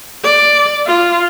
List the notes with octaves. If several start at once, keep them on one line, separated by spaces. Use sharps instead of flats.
D5
F4